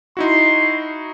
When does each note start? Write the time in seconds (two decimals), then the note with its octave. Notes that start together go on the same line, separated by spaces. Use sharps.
0.17 D#4 E4 F#4 C6